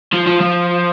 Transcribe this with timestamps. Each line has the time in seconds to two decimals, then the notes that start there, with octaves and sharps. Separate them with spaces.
0.13 F3
0.26 F3
0.40 F3